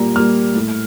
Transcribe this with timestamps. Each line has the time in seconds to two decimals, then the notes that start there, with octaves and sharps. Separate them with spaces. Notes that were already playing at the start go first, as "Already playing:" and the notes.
Already playing: A#2 G3 A#3 A#5
0.16 G3 A#3 F6
0.55 A2